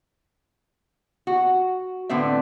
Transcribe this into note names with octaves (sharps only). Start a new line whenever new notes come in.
F#4
A2 D3 B3 C4 E5